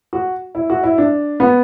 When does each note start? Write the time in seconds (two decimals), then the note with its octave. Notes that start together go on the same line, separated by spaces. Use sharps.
0.13 F#4
0.55 E4
0.70 F#4
0.83 E4
0.98 D4
1.40 B3